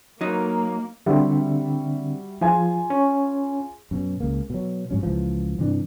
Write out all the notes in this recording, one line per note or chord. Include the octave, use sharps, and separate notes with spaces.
F#3 A#3 D#4
D3 G3 C4 F#4 E5
F3 F4 G#4 G#5
C#4
F#2 B2 F#3
C#2 C#3 A#3
B2 F#3
G#2 F#3 C#4
C#2 E3 F3
G2 C3 E3 D4